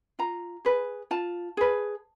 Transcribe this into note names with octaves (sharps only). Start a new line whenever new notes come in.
F4 A#5
G#4 B4
F4 A5
G#4 B4